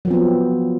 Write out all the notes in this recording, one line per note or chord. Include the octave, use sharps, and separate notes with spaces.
F3 F#3 B3 C4